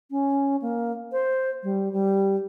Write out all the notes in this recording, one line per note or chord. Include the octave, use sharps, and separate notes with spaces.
C#4
A#3
C5
G3
G3